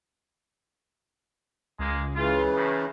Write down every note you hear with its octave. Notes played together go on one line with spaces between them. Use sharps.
C#2 G#3 A#3
C#3 E3 F4
A2 D#3